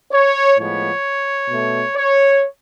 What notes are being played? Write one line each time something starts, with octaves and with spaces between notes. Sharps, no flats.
C#5
A2 F3 G#3 B3 C#5
B2 A3
C#5